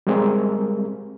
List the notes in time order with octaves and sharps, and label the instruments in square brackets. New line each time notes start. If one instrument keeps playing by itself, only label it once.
[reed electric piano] G3 G#3 C4 G#4 A#4